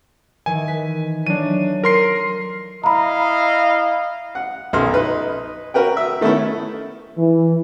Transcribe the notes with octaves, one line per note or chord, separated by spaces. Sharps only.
D#3 E3 G#5
B4 B6
F#3 A3 D4 D#7
A#4 C6 C7
E4 D#5 F5 A#5 B5
F#5
B1 F#2 C6 F6
D#4 B4
F#4 A#4 B4 G5
E5
D#3 A3 B3 C#4 E4
E3